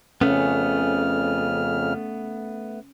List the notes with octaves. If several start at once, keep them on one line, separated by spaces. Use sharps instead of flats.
F2 C#3 A3 B3 C#4 F6